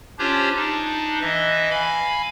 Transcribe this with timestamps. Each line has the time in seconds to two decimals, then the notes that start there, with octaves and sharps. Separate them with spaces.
0.19 C#4 D4 F4 G4 C5 C#5
0.55 D4 D#4
1.21 E3 D#5 E5
1.70 F5 G#5 B5